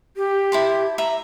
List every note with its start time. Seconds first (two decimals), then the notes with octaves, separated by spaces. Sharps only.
0.17 G4
0.52 E4 A5 C6
0.98 E5 A#5 B5